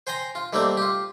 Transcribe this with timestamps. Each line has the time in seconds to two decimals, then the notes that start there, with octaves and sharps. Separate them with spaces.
0.07 C5 G5 G#5 A#5 C6
0.35 F4
0.53 D#3 G3 A3 A#3 C4 D5
0.77 F4 G4